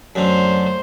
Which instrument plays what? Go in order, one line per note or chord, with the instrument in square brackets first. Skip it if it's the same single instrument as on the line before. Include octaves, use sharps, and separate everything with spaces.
[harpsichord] F#2 D3 [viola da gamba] A3 C5